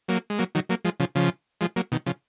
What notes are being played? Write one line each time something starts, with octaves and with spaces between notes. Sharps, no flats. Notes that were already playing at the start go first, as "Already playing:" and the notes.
F#3 A#3
G#3
F#3 A#3
D#3 F#3
F#3 A#3
F3 G#3
C#3 F3
C#3 F3
F3 G#3
F#3 A#3
B2 D#3
C#3 F3